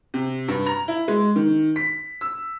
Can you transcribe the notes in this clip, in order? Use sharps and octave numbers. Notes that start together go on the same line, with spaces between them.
C3
G2
A#5
E4
G#3
D#3
B6
E6